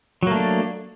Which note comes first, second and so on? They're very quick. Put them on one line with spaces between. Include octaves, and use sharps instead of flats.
F#3 A#3 A3 D4